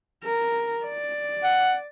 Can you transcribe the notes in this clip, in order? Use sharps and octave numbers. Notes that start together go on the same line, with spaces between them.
A#4
D5
F#5